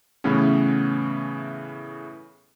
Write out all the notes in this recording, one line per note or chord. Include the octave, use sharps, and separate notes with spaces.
A2 C#3 E3 A3 B3 C#4